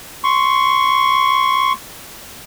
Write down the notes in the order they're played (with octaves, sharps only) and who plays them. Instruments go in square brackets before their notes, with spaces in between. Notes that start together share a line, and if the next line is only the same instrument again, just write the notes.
[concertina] C6 C#6